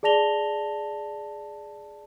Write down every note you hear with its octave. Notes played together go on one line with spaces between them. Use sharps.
G#4 D5 A5 A#6 F7 G7